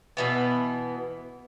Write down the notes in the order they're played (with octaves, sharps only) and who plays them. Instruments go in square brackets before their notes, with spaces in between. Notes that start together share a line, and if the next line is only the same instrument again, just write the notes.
[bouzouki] B2 E3 B3